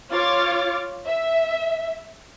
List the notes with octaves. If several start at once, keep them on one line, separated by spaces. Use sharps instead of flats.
F4 C#5 D6 F6 A6
E5